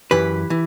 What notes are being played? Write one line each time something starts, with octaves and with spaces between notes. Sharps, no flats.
F#2 E3 G4 B4
E3